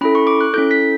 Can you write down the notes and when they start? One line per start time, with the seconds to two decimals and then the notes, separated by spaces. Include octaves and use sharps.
0.01 C#4 E4 A4 B5
0.15 C#6
0.27 D6
0.41 F#6
0.53 C#4 E4 A4 G6
0.71 B6